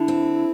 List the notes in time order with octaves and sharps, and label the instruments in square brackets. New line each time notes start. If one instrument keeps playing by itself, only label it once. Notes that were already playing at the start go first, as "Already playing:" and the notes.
Already playing: [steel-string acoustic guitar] D3 [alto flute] E4
[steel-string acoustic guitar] C4